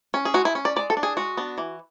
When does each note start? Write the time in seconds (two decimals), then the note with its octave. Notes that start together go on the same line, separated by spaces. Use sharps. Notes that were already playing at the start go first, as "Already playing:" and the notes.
0.14 C#4
0.25 G#4
0.34 G#3 F#4
0.45 E4
0.55 C#4
0.65 D5
0.76 G#3 D5
0.90 A4
0.97 D4
1.03 G#4
1.17 G#3 F#4
1.37 B3 D4
1.58 E3